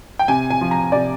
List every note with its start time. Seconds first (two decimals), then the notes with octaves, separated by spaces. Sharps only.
0.19 G5
0.28 C3 G#5
0.50 G#5
0.61 F3
0.71 A#5
0.92 C3 D5